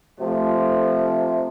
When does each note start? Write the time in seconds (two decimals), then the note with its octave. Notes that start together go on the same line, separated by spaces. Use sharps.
0.20 C3 F3 A3